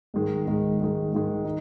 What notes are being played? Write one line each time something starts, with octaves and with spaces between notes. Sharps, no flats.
G#2 D#3 G#3
G#2 D#3 G#3
G#2 D#3 G#3
G#2 D#3 G#3
D#4